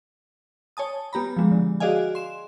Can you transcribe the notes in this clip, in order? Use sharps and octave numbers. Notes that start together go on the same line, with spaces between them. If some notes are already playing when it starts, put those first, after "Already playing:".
C#5 G#5 A5 D#6
B3 G4 A#5 B5
F3 G#3
D3
F#4 G#4 D5 D#5 F5 G#5
C6 E7